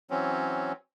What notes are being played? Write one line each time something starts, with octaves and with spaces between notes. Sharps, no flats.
E3 F#3 C4 C#4